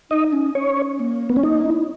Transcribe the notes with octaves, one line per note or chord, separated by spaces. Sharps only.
D#4 D#5
C#4
C#4 C#5
A#3
B3
C#4
A#3 D#4
E4